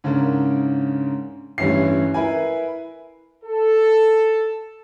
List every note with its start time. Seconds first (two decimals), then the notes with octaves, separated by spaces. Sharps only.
0.04 G#2 C#3 D4 A#4
1.58 A1 G2 E3 C#4 E4 C7
2.14 E4 A#4 B4 G#5
3.44 A4